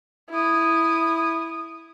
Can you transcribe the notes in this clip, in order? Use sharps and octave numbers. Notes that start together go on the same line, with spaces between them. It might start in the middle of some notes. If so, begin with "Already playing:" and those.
E4 D#6